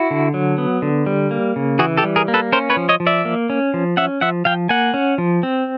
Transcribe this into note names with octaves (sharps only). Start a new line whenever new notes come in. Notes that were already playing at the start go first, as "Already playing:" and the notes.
Already playing: E4 F#4
D3
F#3
B3
D3
G3
A#3
C#3
E3 F#4 G#4
G4 A4
G3
G#4 A#4
A#3
A4 B4
C#4 A#4 C5
B4 C#5
F3
C#5 D#5
F3
D5 E5
A#3
C#4
F3
C#4 E5 F#5
F3 E5 F#5
F3 F5 G5
A#3 F#5 G#5
C#4
F3
C4